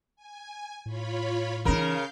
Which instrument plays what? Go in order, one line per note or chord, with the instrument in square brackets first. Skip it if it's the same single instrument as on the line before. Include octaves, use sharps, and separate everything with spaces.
[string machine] G#5
[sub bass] A2 [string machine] F4 C#5 B5
[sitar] C#3 A#4 [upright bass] E3 D#4 [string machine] F5 G6